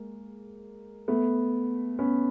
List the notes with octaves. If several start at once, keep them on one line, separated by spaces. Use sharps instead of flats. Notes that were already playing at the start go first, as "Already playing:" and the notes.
Already playing: G#3 A#3
A3 B3
B3 C#4